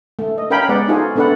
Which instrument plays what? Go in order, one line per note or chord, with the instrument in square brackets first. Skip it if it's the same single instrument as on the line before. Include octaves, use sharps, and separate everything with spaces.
[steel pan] A3
D#5
C#4 A#4 F5 G5 G#5 B5
G#3 B3 D5 F#5
D#4 F4 F#4 G#4 A4 C5
A3 B3 D4 A4 B4 F#5